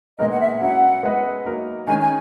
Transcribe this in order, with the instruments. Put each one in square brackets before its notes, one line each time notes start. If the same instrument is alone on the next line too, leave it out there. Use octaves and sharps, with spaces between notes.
[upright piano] A#2 G#3 B3 D#4 A#4 [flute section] D#5
[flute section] F#5
E5
[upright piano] F#3 C#4 E4 [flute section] F#5
[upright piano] G#3 B3 E4 B4 D#5
F#3 A#3 D#4 A#4
[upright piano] D#3 G#3 C#4 [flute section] G#5
[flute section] G#5